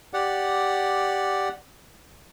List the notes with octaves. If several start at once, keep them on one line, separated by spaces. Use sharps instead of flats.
G4 D5 F#5